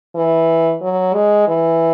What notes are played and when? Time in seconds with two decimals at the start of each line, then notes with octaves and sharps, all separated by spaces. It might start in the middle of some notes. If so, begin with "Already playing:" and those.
0.15 E3
0.81 F#3
1.14 G#3
1.48 E3